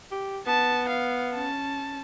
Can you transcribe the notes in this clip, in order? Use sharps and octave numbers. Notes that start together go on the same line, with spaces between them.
G4
B3 A5
F5
C#4 A5